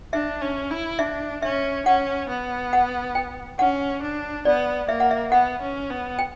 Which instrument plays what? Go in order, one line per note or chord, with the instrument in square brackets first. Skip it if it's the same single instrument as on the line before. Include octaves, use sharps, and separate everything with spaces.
[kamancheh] D4 [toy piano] E5
[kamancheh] C#4
E4
[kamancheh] D4 [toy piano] E5
[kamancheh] C#4 [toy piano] E5
[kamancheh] C#4 [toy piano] F#5
[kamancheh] B3
[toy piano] F#5
G5
[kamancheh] C#4 [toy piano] F#5
[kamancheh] D4
[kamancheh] B3 [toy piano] D5
[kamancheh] A#3 [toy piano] E5
[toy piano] F#5
E5
[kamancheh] B3 [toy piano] F#5
[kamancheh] C#4
B3
[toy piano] G5